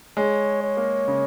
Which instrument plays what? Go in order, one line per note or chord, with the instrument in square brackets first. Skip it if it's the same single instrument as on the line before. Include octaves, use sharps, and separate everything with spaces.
[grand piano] G#3 [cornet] C#5
[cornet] C#5
[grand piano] A#3
C#3